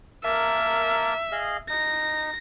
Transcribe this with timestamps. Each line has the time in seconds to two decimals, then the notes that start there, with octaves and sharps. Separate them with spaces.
0.24 A#3 A#4 E5 A5
1.32 G#4 D#5 F5
1.69 D#4 A#6